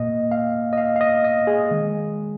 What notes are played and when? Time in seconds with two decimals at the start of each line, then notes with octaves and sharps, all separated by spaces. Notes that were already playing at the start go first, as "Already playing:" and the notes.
Already playing: A#2 A#3 D#5
0.32 F5
0.73 D#5
0.78 F5
0.96 F5
1.01 D#5
1.24 D#5
1.47 G#4
1.71 D#3 G#3